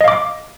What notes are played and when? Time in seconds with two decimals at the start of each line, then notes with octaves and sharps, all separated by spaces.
0.01 D#5
0.04 F5
0.08 D6